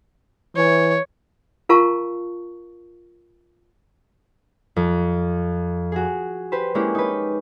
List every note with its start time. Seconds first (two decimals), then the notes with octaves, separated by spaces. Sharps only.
0.56 E3 C#5
1.69 F4 A#4 F5 A5 A#5 C#6
4.76 F2
5.92 F#4 G#4
6.52 G4 B4 C5
6.75 G#3 A#3 C#4 D4 E4 G4
6.95 D#4 B4